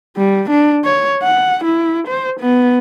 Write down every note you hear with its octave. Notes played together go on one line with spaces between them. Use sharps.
G3
D4
C#5
F#5
E4
C5
B3